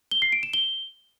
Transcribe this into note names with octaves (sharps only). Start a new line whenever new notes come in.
G7
C7
D7
E7
G7